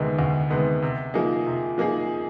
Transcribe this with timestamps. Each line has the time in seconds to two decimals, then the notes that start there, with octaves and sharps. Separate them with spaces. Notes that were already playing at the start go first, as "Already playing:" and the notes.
Already playing: D2 C3 D#3 G#3 B3
0.19 D2
0.50 C3 D#3 G#3 B3
0.82 C3
1.14 F3 A#3 D#4 G#4
1.46 C3
1.78 F3 A#3 D#4 G#4